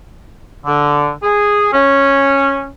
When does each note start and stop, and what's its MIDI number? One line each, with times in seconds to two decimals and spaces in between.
0.66 1.10 50
1.23 1.69 68
1.73 2.66 61